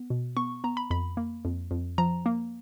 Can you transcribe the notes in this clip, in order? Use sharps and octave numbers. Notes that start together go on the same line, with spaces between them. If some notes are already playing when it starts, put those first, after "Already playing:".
Already playing: B3
B2
B3 C#6
B3 A#5
B5
F2 B5
A#3
F2
F2
F3 A#5
A#3